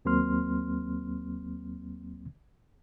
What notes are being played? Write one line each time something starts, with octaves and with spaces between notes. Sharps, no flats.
D#2 F#3 A#3 C4 C6 F6